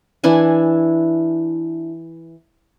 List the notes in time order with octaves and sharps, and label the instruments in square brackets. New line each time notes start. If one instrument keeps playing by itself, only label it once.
[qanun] E3 D4 E4 G#5